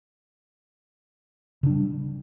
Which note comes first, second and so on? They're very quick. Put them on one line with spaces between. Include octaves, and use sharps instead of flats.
C#3 D4 G3